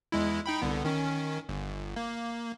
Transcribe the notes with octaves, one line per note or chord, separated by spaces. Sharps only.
E2 G#3 E4
D#4 G5 B5
C2 D3 B3
D#3 C#4
G1
A#3